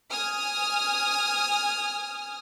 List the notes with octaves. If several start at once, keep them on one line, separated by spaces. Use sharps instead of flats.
G#5 D#6 F6